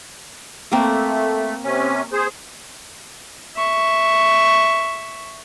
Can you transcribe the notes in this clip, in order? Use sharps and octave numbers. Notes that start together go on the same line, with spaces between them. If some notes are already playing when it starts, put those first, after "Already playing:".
A3 A#3 C4
C3 C#4
G#4 C5
E5 C#6